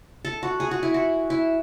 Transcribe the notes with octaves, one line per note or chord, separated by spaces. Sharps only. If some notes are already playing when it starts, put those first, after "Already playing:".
A4
F#4
G#4
F#4
E4
F#4
E4